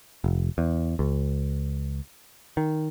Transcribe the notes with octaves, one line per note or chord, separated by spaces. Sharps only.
F1
E2
C#2
D#3